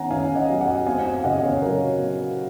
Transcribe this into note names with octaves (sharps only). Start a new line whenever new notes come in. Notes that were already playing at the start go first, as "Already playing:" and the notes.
Already playing: D#3 C#4 F#5 G#5 A#5
C#4 F5 G#5
D#5 F#5
F#3
D#5 F#5
C4 F5 G#5
F5 G#5
C#3 D#5 F#5
C#5 F5
F#3 A#4 C#5
F#3